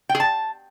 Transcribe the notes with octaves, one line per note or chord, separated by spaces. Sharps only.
G5
G#4
A5